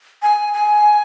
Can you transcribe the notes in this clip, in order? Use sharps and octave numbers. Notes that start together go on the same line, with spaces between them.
G#5
G#5